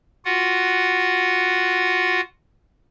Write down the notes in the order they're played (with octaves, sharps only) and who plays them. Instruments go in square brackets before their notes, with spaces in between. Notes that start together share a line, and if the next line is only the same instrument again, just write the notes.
[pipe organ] F4 F#4 F#5